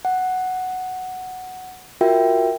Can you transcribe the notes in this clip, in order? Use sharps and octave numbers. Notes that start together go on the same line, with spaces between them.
F#5
F4 F#4 A#4 E5 G5